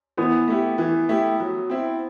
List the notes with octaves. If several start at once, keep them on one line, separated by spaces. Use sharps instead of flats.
E3 B3
A3 E4 G4
E3
A3 E4 G4
F#3
C4 E4